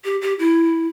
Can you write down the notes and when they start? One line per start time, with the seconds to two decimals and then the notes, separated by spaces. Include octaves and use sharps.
0.05 G4
0.21 G4
0.39 E4